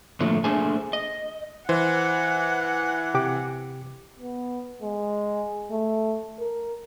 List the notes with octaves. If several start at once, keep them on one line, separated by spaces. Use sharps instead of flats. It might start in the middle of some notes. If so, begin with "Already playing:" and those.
A2 D3 F3 A3 A#3
A3 A#3 D4 G#4 C5 G#5
D#5
E3 C5 F#5
C3 G4 D6
B3
G#3
A3
A#4